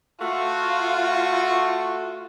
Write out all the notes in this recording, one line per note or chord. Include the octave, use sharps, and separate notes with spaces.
A3 F4 F#4